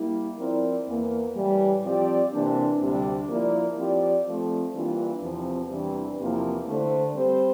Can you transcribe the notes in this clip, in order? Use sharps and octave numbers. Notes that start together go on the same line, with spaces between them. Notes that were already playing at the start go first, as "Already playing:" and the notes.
Already playing: G3 A#3 E4
F3 C4 E4 A#4 D5
E2 E3 A#3
A2 E3 G3
F3 C4 G4 D5
C3 E3 A#3 D4
D2 C3 G3 D4 G4
F3 A#3 E4 A#4 D5
F3 C4 G4 D5
F3 A3 C4
E3 G3 A#3 D4 F4
E2 C3 F3 C4
E2 C3 E3 G3 D4
E2 C3 F3 A#3 E4
D3 A3 D4 A4 C5
G3 C4 G4 C5